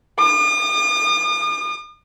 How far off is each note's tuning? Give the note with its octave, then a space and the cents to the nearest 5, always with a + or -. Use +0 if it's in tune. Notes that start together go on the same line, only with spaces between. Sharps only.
D#6 -45